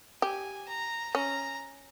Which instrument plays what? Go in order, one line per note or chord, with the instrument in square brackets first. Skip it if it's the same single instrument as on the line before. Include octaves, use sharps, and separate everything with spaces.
[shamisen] G4 [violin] G#5
[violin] A#5
[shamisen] C#4 [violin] A#5